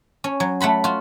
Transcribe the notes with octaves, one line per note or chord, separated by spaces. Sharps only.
C#4
F#3
A3 F#5 B5 C6
F4 F#4